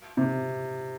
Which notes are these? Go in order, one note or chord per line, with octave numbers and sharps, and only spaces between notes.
C3